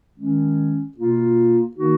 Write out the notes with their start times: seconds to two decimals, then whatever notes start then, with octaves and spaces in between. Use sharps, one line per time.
0.17 D#3 G#3 C#4
0.96 B2 A#3 F4
1.75 D#3 A#3 D#4 F#4